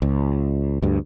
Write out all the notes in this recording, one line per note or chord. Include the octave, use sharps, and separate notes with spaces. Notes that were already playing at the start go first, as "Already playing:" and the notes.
C#2
D2 G2